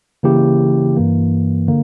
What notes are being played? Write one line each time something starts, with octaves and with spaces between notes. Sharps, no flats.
C#3 E3 A#3 E4 G4
G2 E3 A#3
D3 A#3